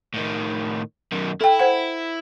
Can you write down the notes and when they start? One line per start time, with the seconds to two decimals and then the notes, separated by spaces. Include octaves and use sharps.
0.14 A2 D#3
1.12 F#2 D#3
1.41 E4 A4 G5
1.60 C5 F#5